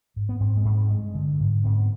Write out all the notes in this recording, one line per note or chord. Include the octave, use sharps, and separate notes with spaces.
G#2
B3
G#2 C4
G#3
G#2
C4
G2 G#3
D3
G#2
G#2 C4
B3